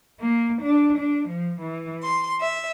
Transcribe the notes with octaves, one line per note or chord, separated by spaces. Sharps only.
A#3
D4
D4
F3
E3
C6
E5